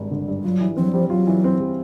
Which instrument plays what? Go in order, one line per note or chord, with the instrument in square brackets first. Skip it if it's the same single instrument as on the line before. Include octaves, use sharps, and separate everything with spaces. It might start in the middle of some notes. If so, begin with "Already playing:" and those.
Already playing: [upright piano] G#1 G2 G3
D3
G2
[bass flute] F#3 [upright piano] F4
[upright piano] E3
[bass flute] F3 [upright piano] C4
[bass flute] F#3
[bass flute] F3 [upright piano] G3
[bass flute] F#3 [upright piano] F4
[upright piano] E3
C4
G3